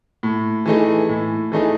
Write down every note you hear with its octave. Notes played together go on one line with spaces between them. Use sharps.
A2
E3 A3 D#4 G#4
A2
E3 A3 D#4 G#4